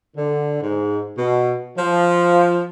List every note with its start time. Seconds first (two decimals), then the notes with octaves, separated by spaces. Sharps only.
0.16 D3
0.61 G#2
1.17 B2
1.77 F3